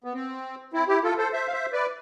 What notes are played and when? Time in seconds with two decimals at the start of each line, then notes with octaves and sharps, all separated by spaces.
0.04 B3
0.14 C4
0.73 C4 E4
0.88 E4 G4
1.03 F4 A4
1.18 A4 C5
1.33 C5 E5
1.47 F5
1.52 C5 E5
1.72 B4 D5